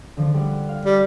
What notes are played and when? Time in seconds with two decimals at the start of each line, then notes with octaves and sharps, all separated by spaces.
0.17 D3 F3
0.34 G3 F#5
0.68 F5
0.85 G3